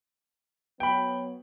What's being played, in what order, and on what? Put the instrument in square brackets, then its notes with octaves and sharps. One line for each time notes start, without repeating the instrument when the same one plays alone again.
[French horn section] F#3 B3 [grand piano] G5 B5